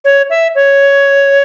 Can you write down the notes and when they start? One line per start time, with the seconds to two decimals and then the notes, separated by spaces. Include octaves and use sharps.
0.05 C#5
0.30 E5
0.55 C#5